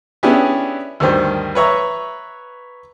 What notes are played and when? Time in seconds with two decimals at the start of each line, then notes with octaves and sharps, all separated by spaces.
0.23 B3 C#4 D4 E4 G4 G#4
1.00 D2 G2 D#3 C5
1.55 B4 C#5 E5 A#5